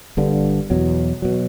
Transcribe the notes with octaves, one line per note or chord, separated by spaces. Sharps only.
G1 G2 D3
E2 B2 F#3
B2 F#3